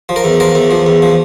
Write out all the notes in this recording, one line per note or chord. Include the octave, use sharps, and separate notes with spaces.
F3
A#4
E2
F3 A#4
E2
F3
E2
F3